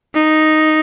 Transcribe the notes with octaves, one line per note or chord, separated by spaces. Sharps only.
D#4